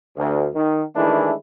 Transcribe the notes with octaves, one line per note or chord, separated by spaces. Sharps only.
D2
D#3
D#3 E3 G#3 A3 D4 E4